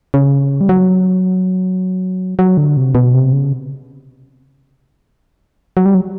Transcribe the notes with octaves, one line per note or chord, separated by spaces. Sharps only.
C#3
G3
F#3
F#3
D3
C3
B2
C3
C#3
F#3
G3
F#3